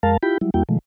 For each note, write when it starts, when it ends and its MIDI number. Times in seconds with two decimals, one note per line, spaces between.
0.03 0.17 41
0.03 0.17 56
0.03 0.17 70
0.03 0.17 77
0.03 0.17 81
0.23 0.38 64
0.23 0.38 65
0.23 0.38 67
0.23 0.38 79
0.23 0.38 83
0.41 0.50 54
0.41 0.50 55
0.41 0.50 64
0.54 0.63 40
0.54 0.63 55
0.54 0.63 58
0.54 0.63 64
0.54 0.63 66
0.54 0.63 79
0.69 0.78 47
0.69 0.78 51
0.69 0.78 53
0.69 0.78 56
0.69 0.78 57